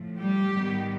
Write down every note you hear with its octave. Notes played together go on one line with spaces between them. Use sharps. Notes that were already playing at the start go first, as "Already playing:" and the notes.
Already playing: A2 F3 A3
G3 G4
G#2 D#3 G3 B3